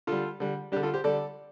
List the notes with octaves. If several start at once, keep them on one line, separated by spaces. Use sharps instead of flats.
D3 G3 F4 A4
D3 G3
D3 G3 D4 G4
F4 A4
G4 C5
D3 G3 A4 D5